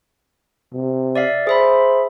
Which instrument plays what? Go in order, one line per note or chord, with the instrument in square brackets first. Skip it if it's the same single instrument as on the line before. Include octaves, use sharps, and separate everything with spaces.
[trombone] C3
[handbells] D5 E5 F5
[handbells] G#4 E5 B5 [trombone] C5